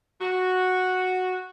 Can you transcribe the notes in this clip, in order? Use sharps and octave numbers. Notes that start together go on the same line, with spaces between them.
F#4